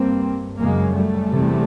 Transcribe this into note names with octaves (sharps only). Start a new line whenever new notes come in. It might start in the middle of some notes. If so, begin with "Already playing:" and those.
Already playing: G2 A#3 C4
F#2 C#3 G#3 A#3
G3 A3
E2 C3